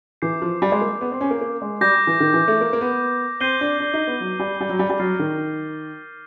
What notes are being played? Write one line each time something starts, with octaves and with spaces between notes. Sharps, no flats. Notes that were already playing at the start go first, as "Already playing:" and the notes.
E3 D6 G6 C7
F3
G3
G#3
A#3
B3
C4
C#4
A#3
A#3
G#3
G3 D6 G6 A#6
E3
D#3
E3
A3
A#3
A#3
B3
C4 G6 C7 D#7 G7
D4
D4
D#4
B3
F#3
G3
G3
F#3
G3
G3
F#3 F6 A6 C7
D#3